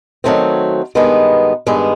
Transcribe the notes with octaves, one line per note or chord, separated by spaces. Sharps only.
D#3 F#3 A3 C4
G2 D#3 G#3 B3
G2 D#3 G#3 B3